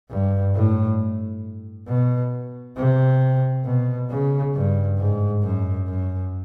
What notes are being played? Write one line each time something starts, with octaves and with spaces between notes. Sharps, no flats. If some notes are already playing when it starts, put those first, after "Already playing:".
G2
A2
B2
C3
B2
C#3
G2
G#2
F#2
F#2